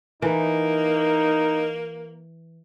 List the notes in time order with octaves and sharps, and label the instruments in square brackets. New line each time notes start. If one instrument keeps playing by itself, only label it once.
[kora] E3 [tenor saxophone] A#3 [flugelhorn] D#4